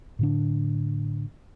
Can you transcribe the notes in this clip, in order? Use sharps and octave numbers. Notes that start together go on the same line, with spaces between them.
A2 D3 D4